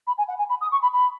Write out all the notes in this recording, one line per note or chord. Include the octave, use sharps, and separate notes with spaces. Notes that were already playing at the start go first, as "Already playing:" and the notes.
B5
G#5
F#5
G#5
B5
D#6
C#6
B5
B5